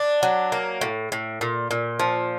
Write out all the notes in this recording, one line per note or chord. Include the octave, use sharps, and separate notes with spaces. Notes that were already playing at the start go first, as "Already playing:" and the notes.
Already playing: D4
F#3
A#3
A2
A2
A#2
A#2
F3